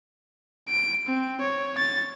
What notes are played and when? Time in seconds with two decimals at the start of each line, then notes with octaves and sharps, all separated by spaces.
0.68 D7
1.07 C4
1.41 C#5
1.78 A6